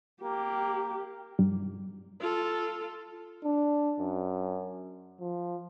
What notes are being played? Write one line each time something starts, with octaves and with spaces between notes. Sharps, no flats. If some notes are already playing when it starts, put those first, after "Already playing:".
A#3 G4
G2
F4 A4
D4
F#2
F3